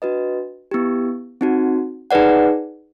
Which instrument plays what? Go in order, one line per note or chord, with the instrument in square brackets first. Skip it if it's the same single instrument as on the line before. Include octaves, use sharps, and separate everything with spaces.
[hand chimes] D4 F#4 B4 D#5
B3 E4 G4
C4 D#4 F#4
D#4 G#4 B4 D5 F#5